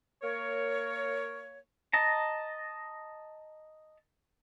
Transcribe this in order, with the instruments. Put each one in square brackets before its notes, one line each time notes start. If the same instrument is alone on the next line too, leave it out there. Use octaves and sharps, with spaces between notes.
[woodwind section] A#3 A#4 C#5
[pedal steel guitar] D#5 A5 A#5